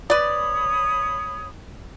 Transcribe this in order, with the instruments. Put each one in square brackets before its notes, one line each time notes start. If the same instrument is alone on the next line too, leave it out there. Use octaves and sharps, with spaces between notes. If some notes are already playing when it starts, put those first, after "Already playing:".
[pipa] B4 D5 [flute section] C#5 B5 D#6